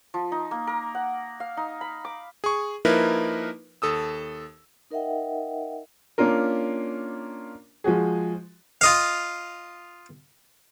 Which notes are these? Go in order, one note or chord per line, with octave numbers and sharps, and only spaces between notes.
F3
D#4
A#3
A#4
F#5
F5
D#4
B5
D6
G#4 C#6
F3 A#3 D#4 E4 A#4 B4
D#2 A4 D#6 E6
D#4 A#4 D#5 E5 F#5 G5
A#3 C#4 D4 F4 A#4
F3 G#3 F#4 G#4
F4 D#5 F5